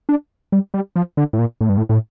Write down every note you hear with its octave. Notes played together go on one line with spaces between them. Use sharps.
D4
G3
G3
F3
D3
A2
A#2
A2
G2
A2
A2